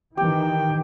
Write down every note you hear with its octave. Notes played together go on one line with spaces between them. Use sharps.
D#3 E3 G4 G5